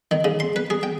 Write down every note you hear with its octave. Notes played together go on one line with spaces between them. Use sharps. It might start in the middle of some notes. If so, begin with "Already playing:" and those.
D#3
C#3
C6
B4
G#4
G5